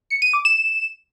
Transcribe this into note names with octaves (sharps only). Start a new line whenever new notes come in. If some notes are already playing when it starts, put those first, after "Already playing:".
C#7
D#7
D6
E7